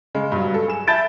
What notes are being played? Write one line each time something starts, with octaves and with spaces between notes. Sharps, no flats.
C#3 G#3
G2 F#3
A4
G#4 E7
E5 A5 B5 G6 A6 D7